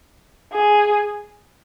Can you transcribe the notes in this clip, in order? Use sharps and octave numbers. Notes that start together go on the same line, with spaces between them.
G#4